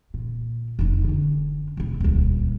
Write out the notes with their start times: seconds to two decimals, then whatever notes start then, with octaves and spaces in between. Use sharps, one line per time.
0.14 A#2
0.79 F1 D#4
1.04 D3 C#4
1.77 E1 E4
2.00 D#1 C#2